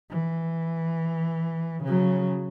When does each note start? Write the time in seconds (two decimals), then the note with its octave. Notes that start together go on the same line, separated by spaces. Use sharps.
0.10 E3
1.84 C#3 F#3